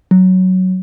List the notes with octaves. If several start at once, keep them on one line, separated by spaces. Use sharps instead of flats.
F#3